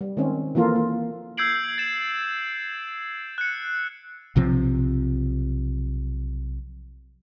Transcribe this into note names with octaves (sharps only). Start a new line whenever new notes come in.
G3
D#3 G#3 C4 C#4
E3 F3 A#3 F4 A4 A#4
A#3
E6 G6 G#6 C7 D7 F#7
A6 E7
F#6 C#7
B1 C3 F3 C4